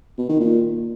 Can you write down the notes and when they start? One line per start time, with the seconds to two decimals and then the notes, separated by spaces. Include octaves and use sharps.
0.18 B2
0.29 D#3
0.40 A#2